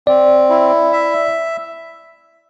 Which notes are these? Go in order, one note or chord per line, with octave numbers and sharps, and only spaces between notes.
C4 D5
E4
E5